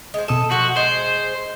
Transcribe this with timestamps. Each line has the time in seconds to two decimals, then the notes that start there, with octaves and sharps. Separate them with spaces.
0.14 G#3 C5
0.28 B2 A4 D#6 E7
0.51 F3 F#4
0.77 G#3 C5